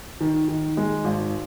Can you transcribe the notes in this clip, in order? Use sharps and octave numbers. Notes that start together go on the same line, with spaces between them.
D#3
D#3
G#3
G#1